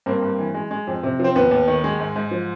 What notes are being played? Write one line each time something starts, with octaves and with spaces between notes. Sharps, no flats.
G2 A#3 C4
G2
E3
G#3
G#3
F2
C3
F3 C4
D#2 B3
D#2
D#3
G#3
G#2
G#2
F3